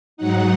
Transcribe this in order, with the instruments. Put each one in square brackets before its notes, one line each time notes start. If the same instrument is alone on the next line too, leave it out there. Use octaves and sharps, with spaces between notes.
[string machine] G#2 F#3 D#4 F#5